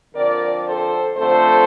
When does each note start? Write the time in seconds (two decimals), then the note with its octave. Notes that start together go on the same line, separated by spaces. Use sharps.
0.15 D3 F3 C4 A#4 D5
0.66 A4 C5
1.17 D3 F3 A3 C4 A4 C5